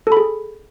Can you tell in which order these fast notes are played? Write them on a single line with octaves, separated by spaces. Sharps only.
A4 B5 G#4